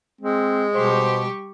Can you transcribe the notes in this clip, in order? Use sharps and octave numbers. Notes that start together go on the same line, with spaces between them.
G#3 C4
B2 G3 G4 C5 C#6